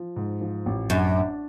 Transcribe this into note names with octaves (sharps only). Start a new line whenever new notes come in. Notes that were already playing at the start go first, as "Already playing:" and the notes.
Already playing: F3
G#2
F3
A1
F#2 D4
D4